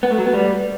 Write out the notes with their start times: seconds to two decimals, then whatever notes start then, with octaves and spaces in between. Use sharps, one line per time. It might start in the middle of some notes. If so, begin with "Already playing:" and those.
0.03 B3
0.11 A3
0.18 F#3
0.26 B3
0.34 G3